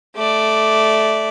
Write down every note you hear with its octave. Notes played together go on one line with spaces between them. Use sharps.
A3 D5